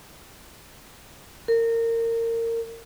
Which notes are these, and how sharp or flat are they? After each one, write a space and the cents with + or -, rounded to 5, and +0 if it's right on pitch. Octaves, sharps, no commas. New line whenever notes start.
A#4 -25